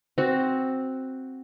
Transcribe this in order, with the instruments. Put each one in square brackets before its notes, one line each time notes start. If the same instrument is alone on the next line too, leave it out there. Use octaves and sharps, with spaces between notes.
[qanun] C4 F#4